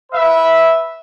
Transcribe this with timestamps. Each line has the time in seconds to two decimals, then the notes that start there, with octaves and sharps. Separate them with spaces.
0.11 B4 E5